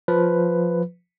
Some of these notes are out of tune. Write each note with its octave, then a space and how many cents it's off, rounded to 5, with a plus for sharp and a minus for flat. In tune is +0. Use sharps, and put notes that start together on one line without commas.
F3 +10 B4 +5